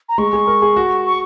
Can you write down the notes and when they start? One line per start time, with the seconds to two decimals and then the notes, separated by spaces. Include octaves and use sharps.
0.09 A#5
0.18 G#3 C#6
0.33 G#4
0.47 A#4
0.62 G#4
0.76 F#4
1.06 C#6